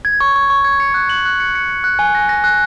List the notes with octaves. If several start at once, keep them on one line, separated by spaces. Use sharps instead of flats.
G#6
C#6
C#6
C#6
G#6
C#7
F#6
F#7
F#6
C#7
C#7
C#7
F#6
G#5
A#6
A#6
F#6